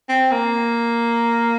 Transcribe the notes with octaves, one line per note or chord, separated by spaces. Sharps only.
C4
A#3